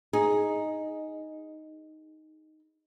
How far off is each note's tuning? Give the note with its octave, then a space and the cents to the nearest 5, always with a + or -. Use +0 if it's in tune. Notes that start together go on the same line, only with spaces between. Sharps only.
D#4 +0 G#4 +0